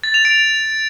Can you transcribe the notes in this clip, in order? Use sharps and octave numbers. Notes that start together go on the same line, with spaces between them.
A6
F7
D7